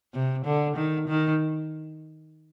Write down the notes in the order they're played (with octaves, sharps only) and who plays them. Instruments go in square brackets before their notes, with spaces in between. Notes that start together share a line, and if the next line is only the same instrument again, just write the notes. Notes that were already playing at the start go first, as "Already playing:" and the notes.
[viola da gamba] C3
D3
D#3
D#3